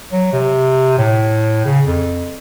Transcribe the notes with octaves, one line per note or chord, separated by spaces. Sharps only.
F#3
C3
A2
C#3
F2